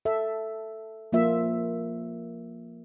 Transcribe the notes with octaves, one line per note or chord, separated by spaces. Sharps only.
A4 E5
F3 A#3 F4 E5